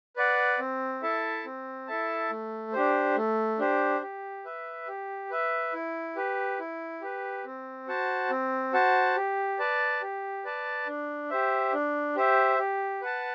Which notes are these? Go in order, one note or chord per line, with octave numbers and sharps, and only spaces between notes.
B4 D5 F#5
C4
E4 A4 E5 A5
C4
E4 A4 E5 A5
A3
D4 G4 C5
A3
D4 G4 C5
G4
B4 E5
G4
B4 E5
E4
G4 B4
E4
G4 B4
C4
F#4 C5 F#5 A5
C4
F#4 C5 F#5 A5
G4
B4 D5 A5
G4
B4 D5 A5
D4
G4 C5 E5
D4
G4 C5 E5
G4
B4 F#5 A5